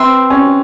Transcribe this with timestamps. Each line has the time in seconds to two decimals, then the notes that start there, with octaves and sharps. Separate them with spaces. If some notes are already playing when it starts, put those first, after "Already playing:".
Already playing: C4 B4 E5 G5 C6
0.30 C#4